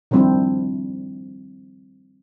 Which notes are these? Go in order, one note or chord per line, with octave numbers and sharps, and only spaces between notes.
D#3 F3 G3 C4 D4 E4